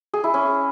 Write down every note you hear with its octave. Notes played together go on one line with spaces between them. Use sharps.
G#4
E4
C#4